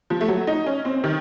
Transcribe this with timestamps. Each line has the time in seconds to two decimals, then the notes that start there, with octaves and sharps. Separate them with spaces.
0.10 F3
0.21 A3
0.28 F#3
0.47 D#4
0.66 C#4
0.85 C4
1.04 D#3